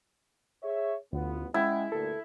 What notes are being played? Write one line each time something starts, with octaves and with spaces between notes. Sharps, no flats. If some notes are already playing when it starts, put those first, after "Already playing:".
G#4 C#5 E5
A1 D2 B3 F4
G#3 C#4 E4 F#5 G5
D2 G2 A#2 A4